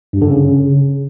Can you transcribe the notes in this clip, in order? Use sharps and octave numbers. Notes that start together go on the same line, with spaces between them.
G2
D3
C#3